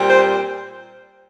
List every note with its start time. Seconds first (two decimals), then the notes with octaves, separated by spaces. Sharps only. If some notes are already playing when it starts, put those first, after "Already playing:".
Already playing: A#2 G3 C4
0.08 C5